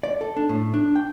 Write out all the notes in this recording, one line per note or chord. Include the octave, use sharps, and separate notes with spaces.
D5
A4
D4
A2
D4
G5